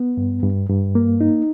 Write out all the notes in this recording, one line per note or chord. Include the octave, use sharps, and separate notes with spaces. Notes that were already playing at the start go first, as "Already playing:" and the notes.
Already playing: B3
G2
G2
G2
A#3
D#4